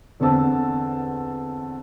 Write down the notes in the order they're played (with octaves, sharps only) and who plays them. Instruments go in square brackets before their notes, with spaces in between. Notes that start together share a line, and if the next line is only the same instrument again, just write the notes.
[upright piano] E2 D3 C4 A5 E6